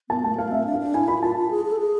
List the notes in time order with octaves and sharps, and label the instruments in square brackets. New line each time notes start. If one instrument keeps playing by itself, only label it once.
[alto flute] B3 [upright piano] A5
[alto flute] A3 [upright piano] A5
[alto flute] A3 [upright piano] F5
[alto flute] C4 [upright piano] E5
[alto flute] D4
[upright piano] F5
[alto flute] D4
[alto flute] E4 [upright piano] G#5
[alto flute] F4 [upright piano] B5
[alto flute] F4 [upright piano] A5
[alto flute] F4
G#4
G#4
A4
G#4